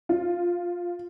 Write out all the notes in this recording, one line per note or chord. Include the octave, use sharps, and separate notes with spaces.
F4